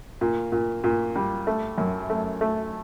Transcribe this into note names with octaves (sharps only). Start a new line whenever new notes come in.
A#2
A#2
A#2
G3
A3
F#2
A3
A3